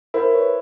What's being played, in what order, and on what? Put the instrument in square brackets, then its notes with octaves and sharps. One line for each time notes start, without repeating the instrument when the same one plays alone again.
[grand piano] E4 [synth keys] A#4 C5
[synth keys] B4 C#5